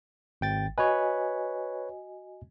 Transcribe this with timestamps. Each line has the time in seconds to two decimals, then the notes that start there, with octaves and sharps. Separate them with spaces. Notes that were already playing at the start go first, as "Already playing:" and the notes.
0.41 G#1 G5 A6
0.78 F#4 B4 C#5 D#5 G#5